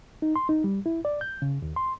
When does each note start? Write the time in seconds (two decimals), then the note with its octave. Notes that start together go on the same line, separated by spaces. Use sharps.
0.22 D#4
0.36 C6
0.49 D#4
0.64 G3
0.86 E4
1.05 D5
1.21 G6
1.42 C#3
1.62 D#2
1.76 C6